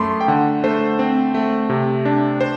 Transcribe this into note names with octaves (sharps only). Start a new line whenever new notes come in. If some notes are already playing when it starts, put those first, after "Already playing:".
Already playing: F#2 A3 B5 C6 D6
G5
D3 F#5
A3 C5
C4
A3
C3
D4
C5